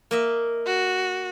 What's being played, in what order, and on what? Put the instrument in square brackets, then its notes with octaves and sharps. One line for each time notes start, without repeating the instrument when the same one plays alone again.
[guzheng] A#3 D#5 E5
[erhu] F#4